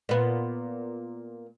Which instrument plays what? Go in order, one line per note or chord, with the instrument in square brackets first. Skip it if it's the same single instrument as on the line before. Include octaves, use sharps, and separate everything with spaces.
[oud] A#2 B3